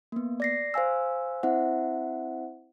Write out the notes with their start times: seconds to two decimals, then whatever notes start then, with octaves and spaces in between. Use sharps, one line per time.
0.12 A#3 B3
0.40 D5 A#6 C7
0.74 C5 F5 G#5 E6
1.43 C4 E4 C5 E5 F#5